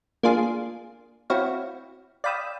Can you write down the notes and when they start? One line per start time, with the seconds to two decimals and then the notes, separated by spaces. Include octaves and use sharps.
0.23 A#3 D4 F4 G#4
1.30 C4 E4 F#4 C#5 F5
2.24 D5 F5 G5 B5 D#6 E6